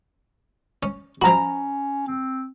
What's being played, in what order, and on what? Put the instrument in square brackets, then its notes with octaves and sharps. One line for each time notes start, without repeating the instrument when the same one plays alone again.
[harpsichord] C#4
[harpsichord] F3 F#4 [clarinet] C#4 [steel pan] A#5 B5
[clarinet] C4